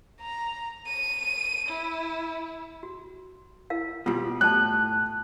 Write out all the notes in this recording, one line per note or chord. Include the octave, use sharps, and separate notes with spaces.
A#5
D#7
E4
F#4
E4 A#4 F5
B2 G3 F4 F#4 F5
A2 D5 A5 F#6